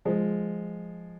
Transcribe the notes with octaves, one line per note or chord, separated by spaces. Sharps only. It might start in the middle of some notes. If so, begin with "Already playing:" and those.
F3 G#3